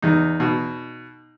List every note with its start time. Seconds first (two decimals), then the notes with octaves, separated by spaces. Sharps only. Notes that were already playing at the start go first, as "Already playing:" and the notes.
0.02 E2 D#4
0.40 B2